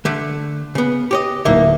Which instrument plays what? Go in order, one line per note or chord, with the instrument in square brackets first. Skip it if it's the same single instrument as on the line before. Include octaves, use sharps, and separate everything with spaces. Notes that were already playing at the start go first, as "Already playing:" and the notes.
[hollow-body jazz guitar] D3 A3
C#3 B3
G4 C#5 D#5
[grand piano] D1 E5 [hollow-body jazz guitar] D3 A#3 D#4